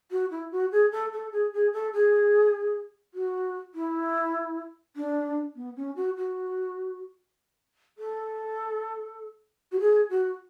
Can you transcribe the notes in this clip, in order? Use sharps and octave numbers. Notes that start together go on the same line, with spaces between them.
F#4
E4
F#4
G#4
A4
A4
G#4
G#4
A4
G#4
F#4
E4
D4
B3
C#4
F#4
F#4
A4
F#4
G#4
F#4